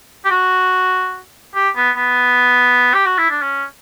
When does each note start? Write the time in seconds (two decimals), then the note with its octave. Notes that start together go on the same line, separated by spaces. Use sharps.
0.25 G4
0.31 F#4
1.55 G4
1.76 B3
1.96 B3
2.94 G4
3.06 F#4
3.18 E4
3.30 D4
3.42 C#4